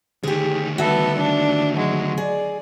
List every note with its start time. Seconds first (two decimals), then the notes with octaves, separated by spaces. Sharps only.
0.23 D2 D#3 G4 G#4
0.78 G3 B3 F#4 A4 E5
1.18 D4
1.74 F#3 G#3
2.18 G#4 D5